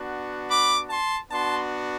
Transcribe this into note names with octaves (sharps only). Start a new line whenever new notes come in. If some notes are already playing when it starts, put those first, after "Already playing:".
Already playing: B3 D4 F#4
B5 D6
A5 C6
B3 D4 F#4 A5 C6